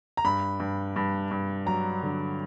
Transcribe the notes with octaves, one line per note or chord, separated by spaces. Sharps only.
A#5
G2 B5
G2
G2
G2
F#3 A#5
D3